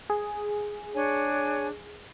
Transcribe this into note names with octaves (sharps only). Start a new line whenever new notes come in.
G#4
D4 C#5 G#5